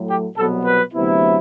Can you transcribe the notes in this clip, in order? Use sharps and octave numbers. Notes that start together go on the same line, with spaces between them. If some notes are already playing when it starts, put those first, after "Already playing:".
Already playing: A2 F#3 A3
G4
C2 B2 F#3 B3 A4
B4
D2 C3 F#3 B3 E4